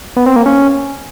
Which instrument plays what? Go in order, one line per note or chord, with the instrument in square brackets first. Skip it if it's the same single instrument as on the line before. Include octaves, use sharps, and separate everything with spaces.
[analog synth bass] B3
C4
A#3
C#4